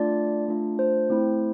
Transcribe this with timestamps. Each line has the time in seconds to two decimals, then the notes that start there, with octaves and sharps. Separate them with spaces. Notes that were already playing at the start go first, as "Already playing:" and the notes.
Already playing: A3 D4 F4 D5
0.48 A3 D4 F4
0.79 C5
1.10 A3 C4 E4